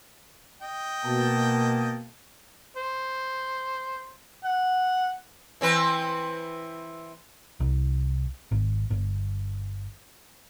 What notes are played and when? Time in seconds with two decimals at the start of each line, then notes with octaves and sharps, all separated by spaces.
0.62 D#5 G5
1.05 B2 A#3 A5
2.77 C5
4.44 F#5
5.61 E3 C4 B4
7.60 C2
8.51 G#1
8.90 G1